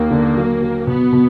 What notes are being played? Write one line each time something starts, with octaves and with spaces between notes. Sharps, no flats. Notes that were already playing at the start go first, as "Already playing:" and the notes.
Already playing: D#2 A#3
D3
F#3
F#3
B2 B3
B2